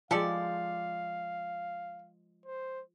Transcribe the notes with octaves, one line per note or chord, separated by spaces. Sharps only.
F3 G#3 G4 A4 D5 F5
C5